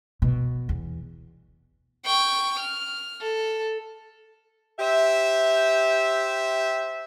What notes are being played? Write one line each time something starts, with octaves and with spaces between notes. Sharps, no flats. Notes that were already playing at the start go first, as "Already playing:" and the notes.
B2
E2
G5 C#6
F6
A4
G4 C5 E5